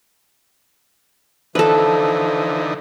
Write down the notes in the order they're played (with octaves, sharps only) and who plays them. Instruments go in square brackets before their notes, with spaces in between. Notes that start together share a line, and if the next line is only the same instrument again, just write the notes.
[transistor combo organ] D3 E3 D#4 [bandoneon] F3 [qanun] A4 B4